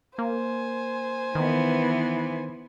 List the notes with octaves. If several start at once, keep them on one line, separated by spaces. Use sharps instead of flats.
A#3 C5 G#5
D#3 E3 B3